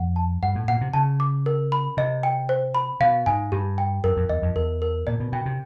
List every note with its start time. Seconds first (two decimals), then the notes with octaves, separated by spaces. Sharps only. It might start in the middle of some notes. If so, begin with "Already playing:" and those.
Already playing: F2 F#5
0.16 A5
0.42 G2 F#5
0.55 A2
0.68 A#2 F#5
0.81 C3
0.93 C#3 A5
1.20 D6
1.46 A#4
1.72 B5
1.97 C3 D#5
2.23 G5
2.49 C5
2.75 B5
3.00 B2 F5
3.26 G#2 G#5
3.52 G2 G4
3.78 G5
4.04 F#2 A#4
4.17 F2
4.29 E2 D#5
4.42 F2
4.56 E2 A#4
4.82 A#4
5.07 A#2 D5
5.20 B2
5.32 B2 G5
5.46 C3